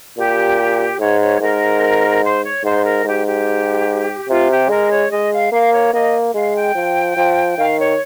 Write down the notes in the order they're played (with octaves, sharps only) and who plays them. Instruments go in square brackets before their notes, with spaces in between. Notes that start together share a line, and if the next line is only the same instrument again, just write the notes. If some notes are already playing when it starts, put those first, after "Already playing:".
[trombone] A#2 [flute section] G4
[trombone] G#2 [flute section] C#5
[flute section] C#5
[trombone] G#2 [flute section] A#4
[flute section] C5
C#5
[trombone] G#2 [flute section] C5
[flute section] A#4
[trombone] G#2 [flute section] G4
[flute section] G4
[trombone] C3 [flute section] F4
[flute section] G4
[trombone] G#3 [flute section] A#4
[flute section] C#5
[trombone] G#3 [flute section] D#5
[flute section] F5
[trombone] A#3 [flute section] F5
[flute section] C#5
[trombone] A#3 [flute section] D#5
[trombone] G#3 [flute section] F5
[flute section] G5
[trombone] F3
F3
[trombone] D#3 [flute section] F5
[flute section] C#5